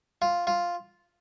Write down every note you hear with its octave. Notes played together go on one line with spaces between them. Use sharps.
F4
F4